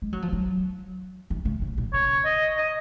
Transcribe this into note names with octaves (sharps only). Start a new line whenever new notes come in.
G#3
F#3
F3
F#3
D#3
C#3
C#3
A#2
C#3 C#5
D#5
D#5